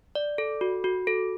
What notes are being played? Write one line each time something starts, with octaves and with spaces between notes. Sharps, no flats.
D5
A4
F#4
F#4
A4